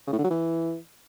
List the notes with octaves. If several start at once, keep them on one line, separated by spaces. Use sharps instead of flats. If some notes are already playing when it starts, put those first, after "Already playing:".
C#3
A2
D3
F#3
E3